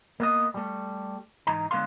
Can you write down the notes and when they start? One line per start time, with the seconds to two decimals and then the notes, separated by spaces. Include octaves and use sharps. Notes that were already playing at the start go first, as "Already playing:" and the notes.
0.20 A#3 B3 D#5
0.54 G3 A3
1.47 G#2 E3 D#4 A#5
1.71 D3 G#3 B3 A#4 F5 C6